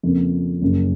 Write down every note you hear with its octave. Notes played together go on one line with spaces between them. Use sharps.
F2 C#3 F3 A#3
F#1 F#2 C#3